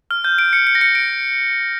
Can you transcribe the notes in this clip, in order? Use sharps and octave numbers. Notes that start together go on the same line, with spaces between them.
F6
G6
D7
C#7
C#7
A#6
C#7
D7